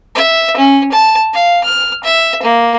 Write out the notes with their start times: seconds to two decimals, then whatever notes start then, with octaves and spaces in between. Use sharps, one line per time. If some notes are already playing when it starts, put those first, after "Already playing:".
0.16 E5
0.57 C#4
0.92 A5
1.34 F5
1.64 F6
2.04 E5
2.43 A#3